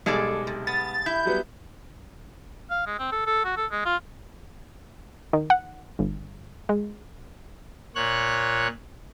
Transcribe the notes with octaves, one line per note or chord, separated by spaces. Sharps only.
B1 G3 G#3 G#4 A4 D5
C3
B3 A6
E4 G6
F#3 G3 B3
F5
G#3
C4
A4
A4
F#4
A4
G#3
F4
D#3
F#5
G1
G#3
A#2 C#5 F#6